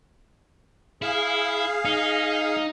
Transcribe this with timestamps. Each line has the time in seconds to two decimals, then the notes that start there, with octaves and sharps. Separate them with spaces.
1.02 E4 G#4 F5
1.85 D#4